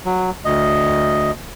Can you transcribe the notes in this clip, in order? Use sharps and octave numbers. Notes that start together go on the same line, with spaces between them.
F#3
D2 D#5